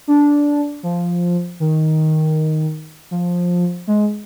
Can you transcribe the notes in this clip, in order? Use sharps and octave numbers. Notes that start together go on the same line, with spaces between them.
D4
F3
D#3
F3
G#3